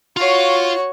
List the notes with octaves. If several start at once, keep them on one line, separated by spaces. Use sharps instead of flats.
F4 F#4 C#5 F5